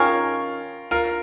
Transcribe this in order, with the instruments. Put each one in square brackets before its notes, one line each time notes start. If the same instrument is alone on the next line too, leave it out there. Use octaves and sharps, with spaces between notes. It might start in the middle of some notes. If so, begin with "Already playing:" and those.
Already playing: [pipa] D#3 C#4 G#4 C#5 [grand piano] F4 A#4
[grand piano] F4 A#4